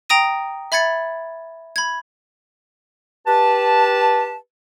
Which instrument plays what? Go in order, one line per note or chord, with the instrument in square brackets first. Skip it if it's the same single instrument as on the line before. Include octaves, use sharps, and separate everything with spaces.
[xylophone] G5 A#5 D#6 A#6 D#7
E5 B5 G#6 A6 C#7
B5 G#6
[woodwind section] G4 B4 A5